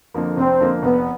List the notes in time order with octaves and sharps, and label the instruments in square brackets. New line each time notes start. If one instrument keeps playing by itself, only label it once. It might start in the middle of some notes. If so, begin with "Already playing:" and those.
[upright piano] F2 D3 F3 A#3
[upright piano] F1 [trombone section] C4
[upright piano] F2 D3 F3 A#3
[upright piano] F1 [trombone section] B3